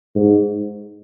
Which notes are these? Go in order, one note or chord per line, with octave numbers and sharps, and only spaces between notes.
G#2